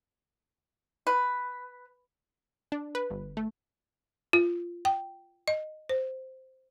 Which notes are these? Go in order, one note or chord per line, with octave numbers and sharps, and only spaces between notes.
B4
D4
B4
G1
A3
F4
G5
D#5
C5